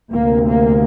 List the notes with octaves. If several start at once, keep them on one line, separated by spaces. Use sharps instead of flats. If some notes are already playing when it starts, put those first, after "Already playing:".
D2 C3 A#3
A#3